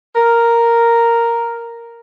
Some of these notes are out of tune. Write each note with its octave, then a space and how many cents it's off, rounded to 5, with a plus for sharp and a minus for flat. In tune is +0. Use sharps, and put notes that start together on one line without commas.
A#4 +0